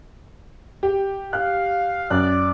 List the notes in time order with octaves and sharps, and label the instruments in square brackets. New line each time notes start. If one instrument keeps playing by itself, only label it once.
[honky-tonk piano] G4
[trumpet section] F5 [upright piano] F#6
[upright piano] F#2 [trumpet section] D5 [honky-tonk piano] F#6